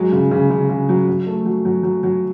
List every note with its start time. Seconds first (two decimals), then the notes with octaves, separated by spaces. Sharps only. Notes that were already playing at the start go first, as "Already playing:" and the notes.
Already playing: F#3 G#3
0.12 C#3
0.31 C#3
0.50 C#3
0.69 C#3
0.89 F#3
1.08 F#3
1.27 A3
1.46 F#3
1.65 F#3
1.83 F#3
2.03 F#3